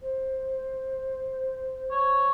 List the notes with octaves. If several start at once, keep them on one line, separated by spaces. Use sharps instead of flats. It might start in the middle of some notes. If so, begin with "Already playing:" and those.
C5
C#5